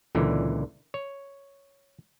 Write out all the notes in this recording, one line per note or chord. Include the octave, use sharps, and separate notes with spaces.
C#2 A#2 D3 E3
C#5